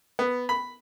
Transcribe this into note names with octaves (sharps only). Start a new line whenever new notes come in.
B3
B5